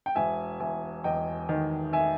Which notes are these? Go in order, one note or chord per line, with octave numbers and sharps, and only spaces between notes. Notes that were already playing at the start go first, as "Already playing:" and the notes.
G5
E1 E5 G#5
E2 E5 G#5
E2 D#5 G5
D#3
E5 G#5